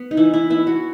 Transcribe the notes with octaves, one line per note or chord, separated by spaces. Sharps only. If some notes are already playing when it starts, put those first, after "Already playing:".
Already playing: B3
D#4
E3 E4
E4
B3 E4
F#4